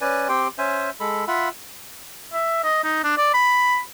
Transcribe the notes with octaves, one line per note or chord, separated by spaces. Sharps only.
C#4 B4 D5 G#5
C4 G4 G5 C6
C#4 C5 E5 G#5
G#3 A4 B5
F4 E5 F#5 B5
E5
D#5
D#4
D4
D5
B5